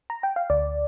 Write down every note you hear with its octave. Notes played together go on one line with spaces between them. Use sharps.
A#5
G5
F5
D2 D5